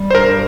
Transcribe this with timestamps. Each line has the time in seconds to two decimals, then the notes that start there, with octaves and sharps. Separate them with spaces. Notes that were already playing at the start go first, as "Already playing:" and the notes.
Already playing: G3
0.11 C5
0.15 G2 A#4